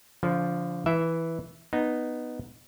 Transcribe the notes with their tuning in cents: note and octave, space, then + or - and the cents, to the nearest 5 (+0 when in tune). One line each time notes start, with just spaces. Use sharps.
D3 -35 F3 -5
E3 -5 E5 +0
B3 +0 D#4 -10